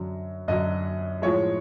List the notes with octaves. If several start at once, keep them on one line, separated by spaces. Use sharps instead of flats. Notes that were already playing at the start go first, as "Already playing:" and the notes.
Already playing: F#2 D3 F#3
F#2 D3 F#3 D#5
A2 F3 G#3 C#5